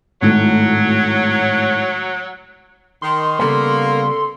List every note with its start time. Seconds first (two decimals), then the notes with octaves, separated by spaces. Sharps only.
0.22 G#1 A2 F#3
3.02 D#3 C6
3.39 C#3 G3 A#3 B3 A4